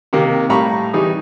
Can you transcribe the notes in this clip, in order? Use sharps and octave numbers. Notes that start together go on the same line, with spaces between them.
C3 D#3 A#3
A2 G3 F5 A#5 B5 C#6
E3 G3 D#4 G#4